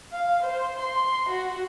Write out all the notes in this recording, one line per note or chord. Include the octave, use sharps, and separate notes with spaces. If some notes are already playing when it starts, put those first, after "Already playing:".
F5
C5
C6
F#4